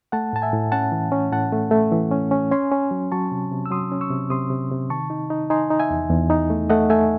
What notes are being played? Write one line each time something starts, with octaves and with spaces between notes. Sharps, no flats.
A3 F#5 A5
A2 A5
E5 G#5
A2
C#4 F#5 A5
E3
C#4
A2 F#5 A5
A3
A3
E3
C#4
C#4
C#4 G#5 C6
C#4
F#3
F#3 A5 C#6
C3
C3
E6
F#3 C6 D#6
C#4
C#6 E6
C3
C3 C6 D#6
C3
C3
D#3 A5 C#6
D#4
D#4
D#4 G#5 C6
D#4
E5 G#5
E2
E2
D#4
A3
A3 D#5 F#5
A3 E5 G#5